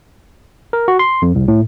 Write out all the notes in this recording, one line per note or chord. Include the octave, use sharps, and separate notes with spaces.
A#4
F#4
C6
F2
C2
A2